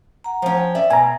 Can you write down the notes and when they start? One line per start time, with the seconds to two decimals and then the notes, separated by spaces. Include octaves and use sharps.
0.24 F#5 A#5
0.42 F3 C#4
0.57 G5
0.75 D5 E5
0.90 B2 G#5 A#5